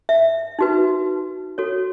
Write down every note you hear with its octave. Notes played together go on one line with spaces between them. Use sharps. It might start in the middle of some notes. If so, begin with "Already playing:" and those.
E5
D#4 F#4 B4
F#4 A4 C#5